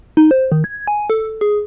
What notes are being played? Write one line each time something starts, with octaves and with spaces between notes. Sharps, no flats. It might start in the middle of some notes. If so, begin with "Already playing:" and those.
D#4
C5
D#3
G#6
G#5
A4
G#4